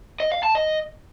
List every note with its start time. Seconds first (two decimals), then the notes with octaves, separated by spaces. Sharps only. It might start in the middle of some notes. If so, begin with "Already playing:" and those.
0.20 D#5
0.32 F5
0.43 A5
0.55 D#5